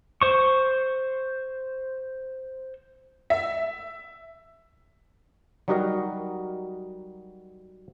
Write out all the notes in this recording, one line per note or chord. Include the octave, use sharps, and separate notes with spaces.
C5 C#6
E5
F#3 G3 D#4 F#4 A#4 D#5